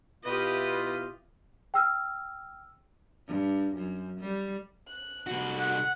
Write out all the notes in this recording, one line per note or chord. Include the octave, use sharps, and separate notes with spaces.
B2 E4 F4 G4 B4 D#5
G5 E6 F6
G2
F#2
G3
F#6
C2 F#4
F#5 F#6